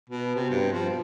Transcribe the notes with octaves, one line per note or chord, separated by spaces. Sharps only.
B2
C3
G2
F3
B2